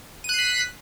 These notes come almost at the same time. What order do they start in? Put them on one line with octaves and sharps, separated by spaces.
D#7 F#6 C7 B6